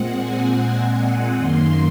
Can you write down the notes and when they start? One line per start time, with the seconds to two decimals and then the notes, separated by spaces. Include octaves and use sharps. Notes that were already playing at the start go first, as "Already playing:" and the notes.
Already playing: A#2 G#3 C4 F#5
0.13 G#5
0.54 G#5
1.35 F#2 D#3 A#3 C6